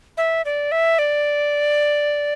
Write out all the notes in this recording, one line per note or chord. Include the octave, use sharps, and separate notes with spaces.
E5
D5
E5
D5